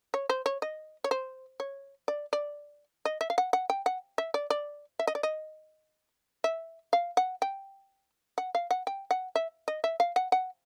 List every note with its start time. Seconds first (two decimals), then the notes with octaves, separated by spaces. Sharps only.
0.14 C#5
0.30 C5
0.46 C#5
0.62 D#5
1.04 C#5
1.11 C5
1.60 C#5
2.08 D5
2.33 D5
3.05 D#5
3.21 E5
3.30 F5
3.38 F#5
3.53 F#5
3.70 G5
3.86 F#5
4.18 E5
4.34 D5
4.50 D5
4.99 E5
5.07 D#5
5.15 D5
5.23 D#5
6.44 E5
6.93 F5
7.17 F#5
7.42 G5
8.38 F#5
8.55 F5
8.71 F#5
8.87 G5
9.11 F#5
9.36 E5
9.68 D#5
9.84 E5
10.00 F5
10.16 F#5
10.32 F#5